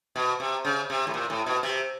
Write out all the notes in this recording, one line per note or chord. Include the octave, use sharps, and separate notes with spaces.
B2
C3
C#3
C3
A2
A#2
A2
B2
C3